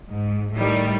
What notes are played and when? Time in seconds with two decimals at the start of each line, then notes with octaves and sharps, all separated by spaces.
0.10 G#2
0.55 A2 D#3 G3